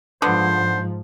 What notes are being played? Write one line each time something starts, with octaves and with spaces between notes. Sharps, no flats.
G#2 D3 F3 B3 C5